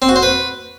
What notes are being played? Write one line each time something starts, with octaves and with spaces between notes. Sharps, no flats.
C4
F#4
C5
B4